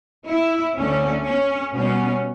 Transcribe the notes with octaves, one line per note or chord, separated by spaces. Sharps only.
E4
D2 D3 A3 C#4
C#4
B2 G3 B3 C#4